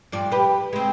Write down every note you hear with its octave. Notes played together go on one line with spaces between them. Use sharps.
G2 F3 D5
G4 B4
G#3 C4